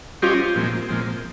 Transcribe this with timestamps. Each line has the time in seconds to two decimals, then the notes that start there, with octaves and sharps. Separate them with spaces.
0.22 G3 C#4 F4 G4 C5 D#5
0.56 A#2 F3 G#3 C4
0.88 A#2 F3 G#3 C4